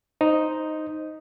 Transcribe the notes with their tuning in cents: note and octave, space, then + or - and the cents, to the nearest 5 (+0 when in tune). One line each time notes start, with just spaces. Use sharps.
D#4 +0 C5 +0